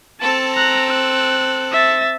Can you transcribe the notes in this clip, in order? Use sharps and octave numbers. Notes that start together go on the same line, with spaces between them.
C4 A4 A5
A#5 F#6
F#6
E5 A6